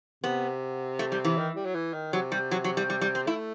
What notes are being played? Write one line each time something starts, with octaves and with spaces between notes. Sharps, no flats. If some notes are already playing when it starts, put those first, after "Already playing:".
C3 B3
A3
G3
E3
D#3
G3
F#3
E3
D#3
C3 F#3
G3
F#3
F#3
G3
G3
G3
C4
A3 E4